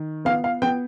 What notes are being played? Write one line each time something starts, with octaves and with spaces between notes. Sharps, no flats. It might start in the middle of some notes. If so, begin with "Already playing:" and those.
Already playing: D#3
B3 F5
F5
B3 G5